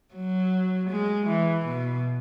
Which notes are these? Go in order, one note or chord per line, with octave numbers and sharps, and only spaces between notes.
F#3
G#3
E3
B2